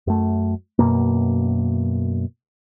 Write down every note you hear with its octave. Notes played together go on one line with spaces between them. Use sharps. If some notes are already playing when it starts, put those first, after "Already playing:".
F#2 A3
F#2 B2 A#3